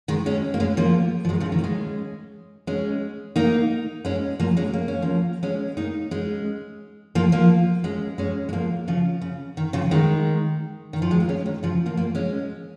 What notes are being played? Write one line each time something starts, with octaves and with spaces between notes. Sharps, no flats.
D#3 G#3
G#3 C#4
A#3
G#3 C#4
F3 A#3
F3
D#3 G#3
C#3 F3
D#3
A#3
G#3 C#4
G#3 C#4
A#3 D#4
G#3 C#4
F3 A#3
G#3 C#4
A#3
C#4
F3 A#3
G#3 C#4
A#3 D#4
G#3 C#4
F3 A#3
F3 A#3
G#3 C#4
G#3 C#4
G#3
F3 A#3
C#3 F3
C#3
D#3
C#3 F3
D#3 G#3
D#3
F3
G#3
A#3
G#3 C#4
D#3
C#3 F3
F3 A#3
F3 A#3
G#3 C#4